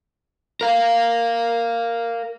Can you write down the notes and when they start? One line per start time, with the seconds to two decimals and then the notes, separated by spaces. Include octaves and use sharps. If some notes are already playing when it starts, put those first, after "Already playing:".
0.61 A#4 F5